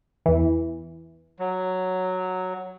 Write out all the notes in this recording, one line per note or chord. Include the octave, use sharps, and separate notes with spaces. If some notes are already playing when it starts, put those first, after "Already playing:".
E2 E3
F#3